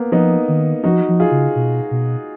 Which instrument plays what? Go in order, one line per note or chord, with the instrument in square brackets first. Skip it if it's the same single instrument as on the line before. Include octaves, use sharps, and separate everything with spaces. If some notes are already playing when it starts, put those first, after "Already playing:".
Already playing: [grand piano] A#3 B3
[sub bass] F3 [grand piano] B3 D#4
[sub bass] D#3
[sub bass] F3 [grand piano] D#4 F#4
[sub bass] F3
[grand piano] F4 G#4
[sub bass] C#3
B2
B2